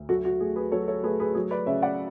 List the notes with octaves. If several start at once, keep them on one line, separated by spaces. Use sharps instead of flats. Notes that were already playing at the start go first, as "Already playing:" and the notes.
Already playing: D2
F#3 F#4 A4
F#4
A3 G#4
G#4 B4
F#3 A4 C#5
A4 C#5
A3 G#4 B4
G#4 B4
F#3 G#4
B4 D5
C#3 C#5 E5
D5 F#5